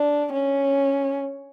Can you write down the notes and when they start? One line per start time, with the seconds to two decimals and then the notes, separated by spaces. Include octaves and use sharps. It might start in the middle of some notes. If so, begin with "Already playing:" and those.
Already playing: D4
0.33 C#4